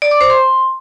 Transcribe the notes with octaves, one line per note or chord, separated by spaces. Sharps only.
D5
D6
C5
C6